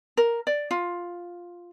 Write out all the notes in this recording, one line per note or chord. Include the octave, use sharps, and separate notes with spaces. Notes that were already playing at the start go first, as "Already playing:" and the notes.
A#4
D5
F4